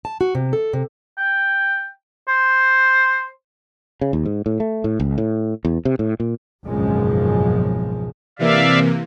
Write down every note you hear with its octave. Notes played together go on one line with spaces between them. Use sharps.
A5
F#4
C3
A4
C3
G5
C5
C#3
D#2
G#2
A2
A3
A2
C#2
A2
E2
C3
A2
A#2
G#1 C#2 F#2 B2 F3 G#3
C3 E3 A#3 D5 E5 F5